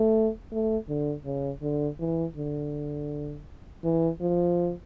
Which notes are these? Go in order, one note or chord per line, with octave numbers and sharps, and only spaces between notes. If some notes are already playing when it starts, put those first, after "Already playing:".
Already playing: A3
A3
D3
C#3
D3
E3
D3
E3
F3